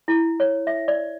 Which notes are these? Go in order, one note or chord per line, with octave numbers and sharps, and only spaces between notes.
E4
C#5
E5
D5